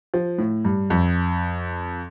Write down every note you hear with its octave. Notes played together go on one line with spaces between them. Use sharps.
F3
A2
G2
F2